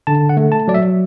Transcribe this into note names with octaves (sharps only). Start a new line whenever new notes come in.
D3 A5
F#5
A3
A5
F#3 D5
E5